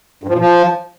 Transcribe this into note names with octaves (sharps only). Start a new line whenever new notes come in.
G2
F3
A#2
F3